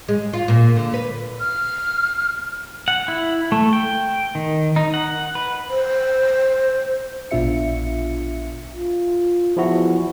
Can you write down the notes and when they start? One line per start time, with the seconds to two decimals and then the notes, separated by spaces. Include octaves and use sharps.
0.08 G#3
0.33 F4
0.48 A#2
0.76 D3
0.94 B4
1.40 F6
2.88 F#5
3.08 E4
3.52 A3
3.73 G5
4.35 D#3
4.76 D#4
4.94 F#5
5.35 B4
5.69 C5
7.31 A#1 B2 D4 F4 E5 C#7
8.73 F4
9.57 E2 F3 E4 F#4